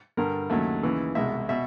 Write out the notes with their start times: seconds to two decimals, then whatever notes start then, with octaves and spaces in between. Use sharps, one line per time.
0.17 G2 D3 G3 A#4
0.50 D#2 C#3 F#3 A3 E5
0.83 D#2 C#3 E3
1.15 C2 B2 G#3 E5
1.49 B2 E5